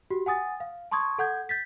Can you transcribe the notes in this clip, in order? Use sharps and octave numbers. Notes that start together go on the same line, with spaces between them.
F#4 G4
F#5 G#5 D#6 A6
F5
A5 C6 C#6 D#6 G#6
A4 F#5 G6 G#6
G6 A6 B6